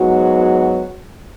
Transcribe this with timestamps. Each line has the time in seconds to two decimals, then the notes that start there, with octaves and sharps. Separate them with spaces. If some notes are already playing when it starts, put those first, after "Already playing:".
Already playing: G#2 F#3 B3 F#4